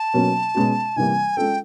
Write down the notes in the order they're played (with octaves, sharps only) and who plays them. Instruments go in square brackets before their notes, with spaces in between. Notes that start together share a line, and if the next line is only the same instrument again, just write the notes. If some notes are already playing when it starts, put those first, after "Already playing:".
Already playing: [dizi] A5
[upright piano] B2 F#3 A#3 C#4
B2 G#3 C#4 F#4
[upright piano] C3 E3 G3 A#3 [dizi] G#5
[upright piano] G#3 C#4 F4 A4 [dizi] G5